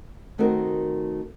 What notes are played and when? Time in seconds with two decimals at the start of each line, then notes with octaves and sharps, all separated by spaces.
0.38 D#3 A3 C4 D#4 F#4 A#4